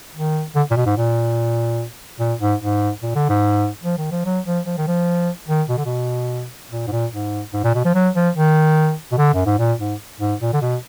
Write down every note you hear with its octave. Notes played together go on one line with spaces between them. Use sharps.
D#3
D3
A#2
B2
G#2
A#2
A#2
G#2
G#2
A#2
D3
G#2
F3
D#3
F3
F#3
F3
F3
D#3
F3
D#3
B2
D3
B2
A#2
G#2
A#2
G#2
G#2
A#2
B2
F3
F#3
F3
D#3
B2
D3
F#2
G#2
A#2
G#2
G#2
A#2
D3
B2